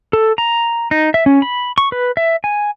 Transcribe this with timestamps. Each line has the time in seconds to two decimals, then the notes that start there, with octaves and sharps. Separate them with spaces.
0.13 A4
0.38 A#5
0.91 D#4
1.14 E5
1.26 C#4
1.42 B5
1.78 C#6
1.92 B4
2.17 E5
2.44 G#5